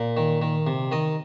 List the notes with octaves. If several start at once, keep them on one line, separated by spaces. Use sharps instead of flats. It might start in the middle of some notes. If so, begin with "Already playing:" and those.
Already playing: A#2
D#3
D#3
C3
D#3 D#5